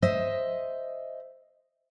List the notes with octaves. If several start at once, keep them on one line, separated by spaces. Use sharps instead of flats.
C5 D#5 E5